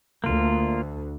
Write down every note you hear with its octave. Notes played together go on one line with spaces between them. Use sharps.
D2 A#3 F4